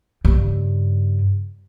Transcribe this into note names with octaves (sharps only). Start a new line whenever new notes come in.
G2 C#3